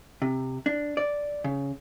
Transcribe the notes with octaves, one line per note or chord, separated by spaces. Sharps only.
C3
D4
D5
C#3